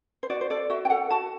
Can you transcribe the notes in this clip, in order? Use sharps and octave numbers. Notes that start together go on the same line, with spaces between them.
C5
F#4 D5
C5
A4 D5
F#4 E5
G5
A4 F#5
F#4 A5